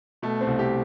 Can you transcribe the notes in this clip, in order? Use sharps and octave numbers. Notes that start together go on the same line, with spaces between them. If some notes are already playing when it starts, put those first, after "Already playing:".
B2 A3
C4
C2
G4